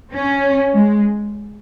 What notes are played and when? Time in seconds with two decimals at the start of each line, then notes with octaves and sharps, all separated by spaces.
0.13 C#4
0.73 G#3